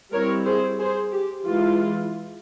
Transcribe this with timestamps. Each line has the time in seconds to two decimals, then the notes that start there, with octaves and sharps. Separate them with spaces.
0.13 G3 C4 E4 A#4 C#5
0.46 G#4 C5
0.79 G#4 C5
1.13 G4
1.46 E3 G#3 E4 F4